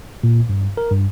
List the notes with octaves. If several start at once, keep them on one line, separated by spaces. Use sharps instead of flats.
A#2
G2
A#4
G2